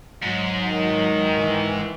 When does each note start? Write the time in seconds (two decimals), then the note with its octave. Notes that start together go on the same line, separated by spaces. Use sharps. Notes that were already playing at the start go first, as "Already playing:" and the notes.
0.23 G#2 F#3
0.68 D#3
1.38 E3